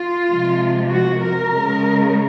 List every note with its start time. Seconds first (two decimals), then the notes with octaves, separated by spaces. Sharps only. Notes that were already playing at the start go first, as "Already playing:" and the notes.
Already playing: F4
0.28 C3 F3 G#3
0.90 F#4
1.19 A#4
1.50 C#3 G#3